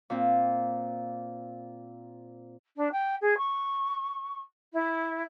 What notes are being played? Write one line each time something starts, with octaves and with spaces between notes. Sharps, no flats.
A#2 C4
D4
G5
G#4
C#6
E4